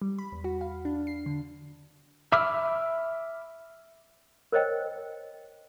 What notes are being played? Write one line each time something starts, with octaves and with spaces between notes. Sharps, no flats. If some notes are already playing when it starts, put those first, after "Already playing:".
G3
B5
E2
F#4
F5
D4
C7
D3
E5 B5 D6 E6 F6
A#4 C5 C#5 D#5 G5